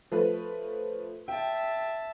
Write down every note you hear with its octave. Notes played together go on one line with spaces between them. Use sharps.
F3 A3 B4
E5 G5 A5